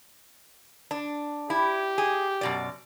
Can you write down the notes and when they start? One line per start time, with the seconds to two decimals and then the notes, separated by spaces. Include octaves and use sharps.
0.91 D4
1.50 E4 G4
1.98 G#4
2.41 F#2 B2 D5